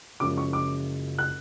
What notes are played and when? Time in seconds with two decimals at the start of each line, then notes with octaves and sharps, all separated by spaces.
0.20 F#1 F#2 C#3 F3 G#3 D6
0.38 C#6
0.53 D6
1.18 F#6